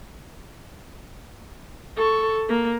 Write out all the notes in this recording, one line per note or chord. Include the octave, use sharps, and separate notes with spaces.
A4 C#6
A#3